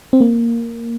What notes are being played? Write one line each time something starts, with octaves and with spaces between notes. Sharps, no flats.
C4
A#3